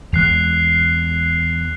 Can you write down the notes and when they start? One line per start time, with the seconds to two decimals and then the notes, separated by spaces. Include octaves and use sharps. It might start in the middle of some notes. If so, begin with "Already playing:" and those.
0.13 E2 G#3 F#6 C7 F7